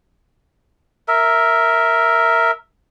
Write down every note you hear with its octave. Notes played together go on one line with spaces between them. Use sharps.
A#4 E5